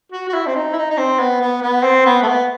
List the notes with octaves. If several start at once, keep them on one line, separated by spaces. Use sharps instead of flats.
F#4
F#4
E4
C4
D#4
E4
D#4
D#4
C4
B3
B3
B3
C4
B3
A3
B3